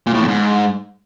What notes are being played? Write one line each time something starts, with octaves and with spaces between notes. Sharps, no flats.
A#2
A2
E2
G#2